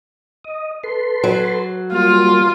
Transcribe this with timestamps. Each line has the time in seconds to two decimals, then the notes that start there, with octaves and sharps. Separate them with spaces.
0.45 D#5
0.83 A4 B4 C6
1.24 F#3
1.92 G3 A#3 F4